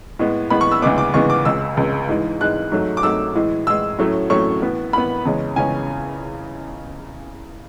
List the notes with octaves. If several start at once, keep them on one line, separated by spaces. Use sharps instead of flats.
A2 G#3 B3
A2 G#3 B3 B5
C#6
E6
D2 C#3 E3 G#3 B3 D6
D6
D2 C#3 E3 G#3 B3 C#6
D6
C#2 C#3 G#3 E6
C#2 C#3 G#3
G#2 E3 G#3
G#2 E3 G#3 F#6
G#2 F#3 A3
D6
G#2 F#3 A3 E6
A2 E3 G#3
A2 E3 G#3 E6
A2 F#3 A3 C#4
A2 F#3 A3 C#4 C#6
A2 E3 B3
A2 E3 B3 B5
E2 C#3 G#3 C#4
E2 C#3 G#3 C#4 G#5